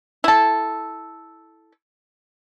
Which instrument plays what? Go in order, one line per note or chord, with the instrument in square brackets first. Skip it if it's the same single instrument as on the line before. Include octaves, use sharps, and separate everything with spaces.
[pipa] E4 A4